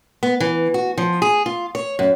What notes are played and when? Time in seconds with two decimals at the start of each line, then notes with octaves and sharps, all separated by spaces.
0.23 B3
0.40 E3
0.74 F#4
0.98 F3
1.22 G#4
1.46 F4
1.75 C#5
1.99 F#2